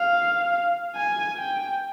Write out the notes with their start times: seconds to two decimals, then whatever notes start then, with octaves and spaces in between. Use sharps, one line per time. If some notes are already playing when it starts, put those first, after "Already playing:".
Already playing: F5
0.96 G#5
1.37 G5